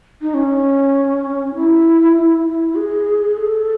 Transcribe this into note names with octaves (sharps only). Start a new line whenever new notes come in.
D#4
C#4
E4
E4
E4
G#4
A4